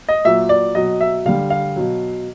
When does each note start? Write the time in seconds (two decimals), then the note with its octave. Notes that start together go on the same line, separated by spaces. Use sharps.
0.09 D#5
0.25 A#2 F#3 E5
0.49 D5
0.75 B2 F#3 D#5
1.01 E5
1.25 D3 G3 F5
1.50 F5
1.76 B2 F#3